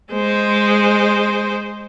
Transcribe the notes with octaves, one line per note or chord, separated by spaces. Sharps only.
G#3 C5